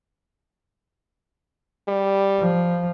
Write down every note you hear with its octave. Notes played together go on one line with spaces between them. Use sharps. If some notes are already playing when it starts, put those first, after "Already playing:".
G3
F3